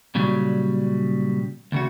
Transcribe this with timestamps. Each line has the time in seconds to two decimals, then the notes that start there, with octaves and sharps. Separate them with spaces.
0.15 A#2 C#3 F#3 G3
1.72 D2 C#3 F#4